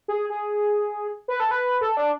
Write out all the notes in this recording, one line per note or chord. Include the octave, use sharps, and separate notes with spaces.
G#4
G#4
B4
A4
B4
A4
D4